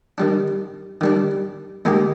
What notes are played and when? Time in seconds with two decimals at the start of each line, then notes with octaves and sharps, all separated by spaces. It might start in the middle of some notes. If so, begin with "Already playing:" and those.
0.18 D#3 G3 D4
1.01 D#3 G3 D4
1.85 D#2 D#3 G#3 D#4 G4